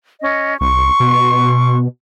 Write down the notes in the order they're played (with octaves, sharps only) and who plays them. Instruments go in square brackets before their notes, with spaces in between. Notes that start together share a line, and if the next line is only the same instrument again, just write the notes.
[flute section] C#4 D#5
[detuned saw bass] C2 [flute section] C6 C#6
[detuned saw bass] B2